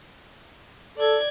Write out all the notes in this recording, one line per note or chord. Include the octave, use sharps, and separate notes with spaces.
A4 D5 G#6